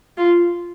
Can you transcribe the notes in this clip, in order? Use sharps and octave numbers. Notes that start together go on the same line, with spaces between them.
F4